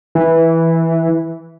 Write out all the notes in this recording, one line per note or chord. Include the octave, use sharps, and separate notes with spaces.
E3